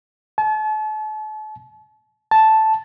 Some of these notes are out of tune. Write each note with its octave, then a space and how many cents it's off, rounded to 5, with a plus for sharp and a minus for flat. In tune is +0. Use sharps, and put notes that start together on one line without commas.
A5 -40
A5 -5